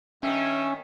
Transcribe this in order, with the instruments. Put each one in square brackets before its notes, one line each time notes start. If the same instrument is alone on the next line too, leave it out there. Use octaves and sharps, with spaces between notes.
[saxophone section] G2 D#3 [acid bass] C#4 [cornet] E5